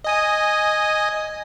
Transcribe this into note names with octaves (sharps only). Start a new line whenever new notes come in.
D#5 G#5 D#6